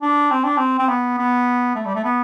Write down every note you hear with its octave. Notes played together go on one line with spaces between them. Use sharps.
D4
C4
D4
C4
C4
B3
B3
A3
G3
A3
B3